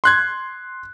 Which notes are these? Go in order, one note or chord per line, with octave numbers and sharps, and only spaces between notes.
C6 F#6 G#6